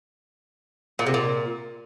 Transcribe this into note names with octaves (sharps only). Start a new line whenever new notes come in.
A#2
C3
A#2